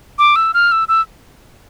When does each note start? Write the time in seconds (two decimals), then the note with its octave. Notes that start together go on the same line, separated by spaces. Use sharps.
0.19 D6
0.36 E6
0.54 F6
0.72 E6
0.88 E6